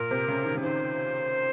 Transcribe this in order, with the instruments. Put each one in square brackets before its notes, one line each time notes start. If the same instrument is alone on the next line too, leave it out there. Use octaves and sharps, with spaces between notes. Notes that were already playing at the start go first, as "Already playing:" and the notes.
Already playing: [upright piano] A#2 [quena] A#4
[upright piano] C3
C#3
D#3
C#3
[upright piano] D#3 [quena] C5